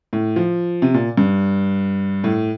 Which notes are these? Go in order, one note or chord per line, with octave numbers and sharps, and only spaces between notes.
A2
F3
C3
A#2
G2
A2